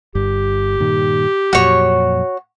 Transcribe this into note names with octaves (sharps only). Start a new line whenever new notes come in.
G1 G2 G4
G2 A#2 D#3
F2 A#2 F#3 F#4 C#5